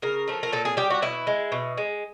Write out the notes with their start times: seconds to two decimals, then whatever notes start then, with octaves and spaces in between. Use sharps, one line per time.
0.02 C#3 A#4
0.28 F3 A3
0.43 A#4
0.52 A#2 A4
0.65 G#4
0.77 G3 G4
0.90 F#4
1.02 B2 E4
1.27 G#3
1.52 B2
1.78 G#3